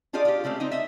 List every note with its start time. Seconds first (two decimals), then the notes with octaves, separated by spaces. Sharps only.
0.13 D4 F4 G4 G#4 D5 D#5
0.25 F4 G4
0.44 C#3 G#3 A3 C4
0.60 C4 D#4 D#5
0.71 D#5 E5